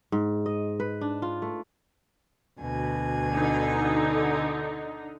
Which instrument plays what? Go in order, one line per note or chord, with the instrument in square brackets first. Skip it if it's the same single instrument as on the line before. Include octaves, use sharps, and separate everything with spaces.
[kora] G#2
D#5
B4
D4
F4
A3
[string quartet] D2 B2 G#5
[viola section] D3 D#4